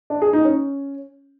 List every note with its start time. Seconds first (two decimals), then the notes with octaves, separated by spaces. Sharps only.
0.10 D4
0.22 G#4
0.33 D#4
0.45 C#4